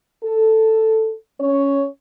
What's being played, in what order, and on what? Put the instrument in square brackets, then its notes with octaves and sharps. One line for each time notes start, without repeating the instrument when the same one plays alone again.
[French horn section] A4
C#4 C#5